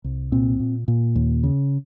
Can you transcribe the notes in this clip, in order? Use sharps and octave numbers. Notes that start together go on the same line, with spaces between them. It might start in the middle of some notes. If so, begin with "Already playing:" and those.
C2
A#2 C4
A#2
A#2
D#2
C#3